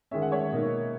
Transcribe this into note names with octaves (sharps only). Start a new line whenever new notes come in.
D#3 G#3 C#4 E5
F#5
C#5 E5
B2 A#3 D#4